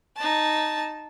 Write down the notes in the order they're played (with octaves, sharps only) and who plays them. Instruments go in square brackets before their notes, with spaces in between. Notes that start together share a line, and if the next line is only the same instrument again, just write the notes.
[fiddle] D#4 A5